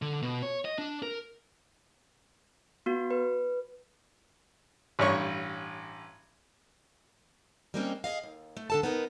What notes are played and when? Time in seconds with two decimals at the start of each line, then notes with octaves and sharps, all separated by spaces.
0.02 D3
0.22 B2
0.43 C#5
0.65 D#5
0.78 D4
1.02 A#4
2.86 B3 F#4
3.11 B4
4.99 A1 G2 C#5 C#6
7.74 G3 G#3 A#3 C4 C#4 G4
8.04 G#4 D#5 F5
8.23 D#2
8.57 A3
8.70 D3 A4 A5
8.83 B3 D#4 A#4